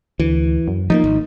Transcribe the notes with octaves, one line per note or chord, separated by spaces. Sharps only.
D2 E3
F#2
F3 G3 A#3 D#4
G#1